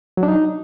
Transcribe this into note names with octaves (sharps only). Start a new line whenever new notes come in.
F#3
D4
D#4